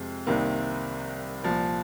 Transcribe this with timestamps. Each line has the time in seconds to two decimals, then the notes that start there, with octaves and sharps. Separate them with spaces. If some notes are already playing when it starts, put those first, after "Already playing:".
Already playing: F2 C3 G#3
0.27 C2 C3 D#3 A#3
1.43 C2 A#2 F3